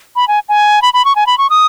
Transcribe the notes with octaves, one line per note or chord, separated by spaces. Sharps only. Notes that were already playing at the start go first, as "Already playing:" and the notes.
B5
G#5
G#5
B5
B5
C#6
G#5
B5
C#6
D#6